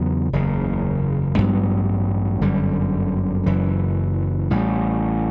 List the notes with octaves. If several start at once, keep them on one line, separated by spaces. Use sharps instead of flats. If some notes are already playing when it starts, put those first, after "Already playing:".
Already playing: E2 C#3 F#3 B3
F#1 E2 C#3
A1 G2 F#3 B3
G1 F#2 D3 G3
F#1 F#2 E3
A1 A2 G3